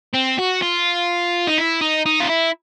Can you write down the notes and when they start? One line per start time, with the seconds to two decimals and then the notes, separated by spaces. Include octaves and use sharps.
0.14 C4
0.38 F#4
0.62 F4
1.47 D#4
1.58 E4
1.81 D#4
2.06 D#4
2.20 F4
2.29 E4